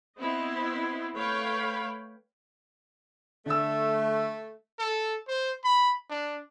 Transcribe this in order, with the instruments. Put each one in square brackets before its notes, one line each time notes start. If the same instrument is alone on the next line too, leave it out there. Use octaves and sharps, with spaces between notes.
[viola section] B3 C4 E4 B4 D#5 C6
A3 B4 C#5 F5 G5 B5
[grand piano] D3 E6 [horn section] A3
[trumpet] A4
C5
B5
D4